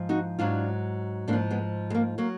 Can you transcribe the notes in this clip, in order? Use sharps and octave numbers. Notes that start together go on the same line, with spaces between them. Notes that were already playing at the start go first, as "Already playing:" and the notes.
Already playing: G#2 F3
D#4 F#4
G#2 F#3 D4 F4
G#2 A#3 D4
F3
G#3 B3
G#3
A#3
F#3 A#3